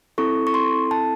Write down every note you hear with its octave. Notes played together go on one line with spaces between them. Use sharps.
C4 E4 A4 C#6
C#6
C6
A5